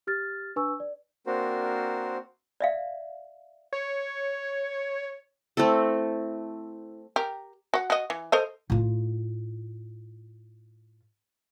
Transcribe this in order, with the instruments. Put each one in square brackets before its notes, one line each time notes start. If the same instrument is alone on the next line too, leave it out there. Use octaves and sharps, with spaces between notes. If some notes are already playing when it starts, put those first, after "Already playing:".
[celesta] G4 F6 A6
D4 B4 G#5 C#6 E6
D5
[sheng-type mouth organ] A#3 C4 D4 F#4 A#4 C5
[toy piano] D5 E5 F5
[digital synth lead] C#5
[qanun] A3 C4 E4 A4
[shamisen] G4 A#4
F#4 F#5
F#4 D#5
E3
A4 C5 D#5
[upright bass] A2 F4